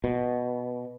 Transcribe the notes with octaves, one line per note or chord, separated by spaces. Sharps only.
B2